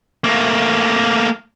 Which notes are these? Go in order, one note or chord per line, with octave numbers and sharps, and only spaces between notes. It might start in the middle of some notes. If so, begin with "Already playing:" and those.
A3 A#3